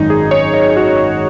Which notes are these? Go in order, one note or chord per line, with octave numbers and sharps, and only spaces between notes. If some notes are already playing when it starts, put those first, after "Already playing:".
Already playing: G#1 F#2 D#3 G#3 D#4
G#4
C#5
D#5
F#4